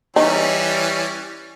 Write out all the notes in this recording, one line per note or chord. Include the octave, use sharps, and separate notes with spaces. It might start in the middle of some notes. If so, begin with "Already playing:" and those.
E3 G3 C#4 D#4